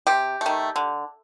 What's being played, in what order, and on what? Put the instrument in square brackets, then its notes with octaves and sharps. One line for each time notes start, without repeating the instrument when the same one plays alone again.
[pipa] C3 G4
D#3 A3
D3